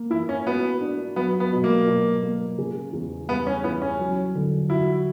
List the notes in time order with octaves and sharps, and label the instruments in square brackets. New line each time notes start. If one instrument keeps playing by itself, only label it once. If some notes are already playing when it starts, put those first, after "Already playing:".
Already playing: [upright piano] A#3
[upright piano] E3 [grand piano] E4
[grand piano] C#4
[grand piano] B3 [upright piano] F#4
[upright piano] D4
[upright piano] F#3 [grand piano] B3
[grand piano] B3
[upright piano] B2
[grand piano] A#3
[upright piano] B2
A#3
C#3
E2
[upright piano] G3 [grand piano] B3
[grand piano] C#4
[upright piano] E3 [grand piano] B3
[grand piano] C#4
[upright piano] F#3
D3
[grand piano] E4 [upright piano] F#4